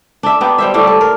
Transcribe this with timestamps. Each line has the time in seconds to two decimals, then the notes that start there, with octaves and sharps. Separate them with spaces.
0.23 D4 E5
0.41 B3 D4 D#4 G4
0.58 G3 C5 E5
0.74 A2 G3 D4
0.87 A4
1.01 A#4